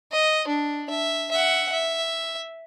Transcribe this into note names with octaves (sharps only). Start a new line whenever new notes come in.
D#5
D4
E5
E5 F#5
E5